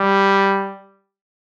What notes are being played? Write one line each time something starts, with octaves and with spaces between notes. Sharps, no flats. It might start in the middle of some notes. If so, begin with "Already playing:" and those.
Already playing: G3